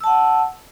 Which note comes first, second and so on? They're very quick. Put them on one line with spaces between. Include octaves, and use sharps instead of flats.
E6 A5 F#5